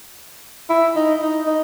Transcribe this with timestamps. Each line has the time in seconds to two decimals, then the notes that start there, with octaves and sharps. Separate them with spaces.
0.70 E4
0.96 D#4
1.22 D#4
1.47 D#4